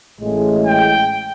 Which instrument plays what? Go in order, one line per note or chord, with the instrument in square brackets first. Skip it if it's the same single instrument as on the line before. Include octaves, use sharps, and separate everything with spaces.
[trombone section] A1 A2 G#3
[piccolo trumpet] G5